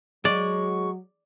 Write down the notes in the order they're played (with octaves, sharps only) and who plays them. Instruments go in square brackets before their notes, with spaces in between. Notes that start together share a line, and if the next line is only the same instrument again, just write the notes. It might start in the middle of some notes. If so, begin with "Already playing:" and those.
[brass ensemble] F#3 [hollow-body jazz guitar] G#3 [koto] D5 [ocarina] C#6